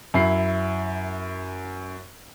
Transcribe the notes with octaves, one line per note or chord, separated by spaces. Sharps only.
F#2 E4 C7